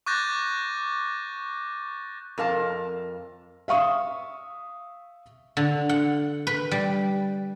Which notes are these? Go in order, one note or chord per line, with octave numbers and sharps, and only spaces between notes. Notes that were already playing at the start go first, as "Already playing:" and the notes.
C#6 D6 F#6 G6 A6 A#6
F2 A#4 F5 A5
E5 F5 C#6 D#6
D3
F#5
B4
G3